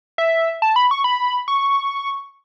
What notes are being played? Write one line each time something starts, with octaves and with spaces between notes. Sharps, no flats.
E5
A5
B5
C#6
B5
C#6